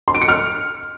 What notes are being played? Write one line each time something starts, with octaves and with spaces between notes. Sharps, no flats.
C6
D7
C#7
F6